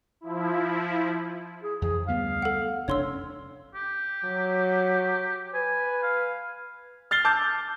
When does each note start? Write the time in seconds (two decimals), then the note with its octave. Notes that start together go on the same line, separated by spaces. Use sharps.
0.21 F3 E4
1.63 G#4
1.82 F2 E3 G#4
2.08 D2 G3 B3 F5
2.42 A4 F#5
2.88 F1 C#4 D4 C#5 C6 E6
3.74 G4
4.25 F#3
5.54 B4 G#5
6.03 F5
7.11 F6 A6 C7 G7
7.25 A5 D6 E6 G6